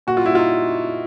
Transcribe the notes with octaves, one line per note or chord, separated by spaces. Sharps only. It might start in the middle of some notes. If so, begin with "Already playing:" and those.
A#2 F#4
F4
G3 E4
D#4 F4